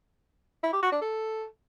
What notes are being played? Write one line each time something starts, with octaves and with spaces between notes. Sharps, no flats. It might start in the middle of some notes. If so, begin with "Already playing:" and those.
E4
G4
F#4
D4
A4